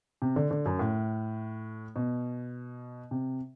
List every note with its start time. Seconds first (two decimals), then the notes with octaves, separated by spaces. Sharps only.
0.22 C3
0.36 D3
0.51 D3
0.66 F#2
0.79 A2
1.96 B2
3.11 C3